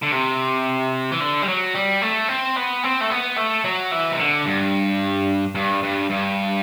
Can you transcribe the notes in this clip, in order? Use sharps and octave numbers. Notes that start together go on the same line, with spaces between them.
D3
C3
E3
D3
G3
F#3
G3
A3
C4
B3
C4
A3
B3
A3
F#3
E3
C3
D3
G2
G2
G2
G2